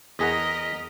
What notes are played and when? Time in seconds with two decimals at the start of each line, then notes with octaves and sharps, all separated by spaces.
0.19 E2 G#4 A#4 D#5 F#5 A#5 B6